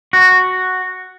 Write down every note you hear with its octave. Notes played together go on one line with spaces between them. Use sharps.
F#4